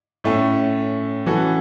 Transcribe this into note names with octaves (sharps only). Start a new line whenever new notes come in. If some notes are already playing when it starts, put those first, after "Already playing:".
A2 A3 C#4
E3 C#4 F#4 A4